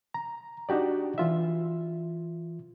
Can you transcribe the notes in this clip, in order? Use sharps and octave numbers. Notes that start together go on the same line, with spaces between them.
A#5
D4 D#4 F#4 G4 D5
E3 F4 E5